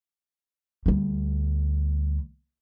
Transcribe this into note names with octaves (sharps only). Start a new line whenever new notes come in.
D2 G3